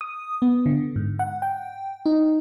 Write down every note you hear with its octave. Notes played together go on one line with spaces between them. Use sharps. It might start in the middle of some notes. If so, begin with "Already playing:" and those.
D#6
B3
D3
G#2
F#5
G5
D#4